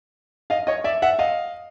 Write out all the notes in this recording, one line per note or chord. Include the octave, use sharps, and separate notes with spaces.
D#5 F5
C#5 D#5
D5 E5
E5 F#5
D#5 F5